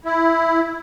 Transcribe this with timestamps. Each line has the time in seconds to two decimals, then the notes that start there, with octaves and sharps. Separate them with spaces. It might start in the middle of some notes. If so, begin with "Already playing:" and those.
0.05 E4